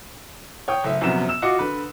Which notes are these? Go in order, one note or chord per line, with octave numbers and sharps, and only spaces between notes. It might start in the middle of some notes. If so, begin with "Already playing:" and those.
C#5 G5 D#6
F#1 A3 E5
A#1 F#2 C3 B3 E7
E6 E7
F4 F#4 D#5 D6 C#7
D3 B4